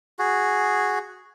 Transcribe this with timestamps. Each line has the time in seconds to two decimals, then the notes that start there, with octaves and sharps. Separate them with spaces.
0.19 F#4 G#4